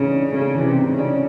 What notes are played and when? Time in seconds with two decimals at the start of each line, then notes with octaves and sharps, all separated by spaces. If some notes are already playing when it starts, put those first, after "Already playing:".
Already playing: G#2 C#3 E3 A3
0.11 D4
0.33 C#3 A3
0.55 E3
0.62 C3
0.77 G#2
0.92 C#3
0.99 D4